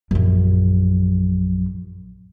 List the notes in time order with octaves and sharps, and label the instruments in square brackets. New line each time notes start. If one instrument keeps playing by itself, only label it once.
[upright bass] A#1 F#2